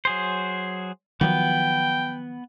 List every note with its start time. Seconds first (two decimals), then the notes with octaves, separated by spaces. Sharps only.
0.05 F#3 G#4 C5
1.21 D#3 F3 F#3 B3 G5